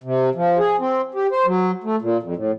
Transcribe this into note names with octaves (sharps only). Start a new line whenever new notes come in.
C3
F3
G#4
C4
G4
C5
F#3
A3
A#2
F2
A2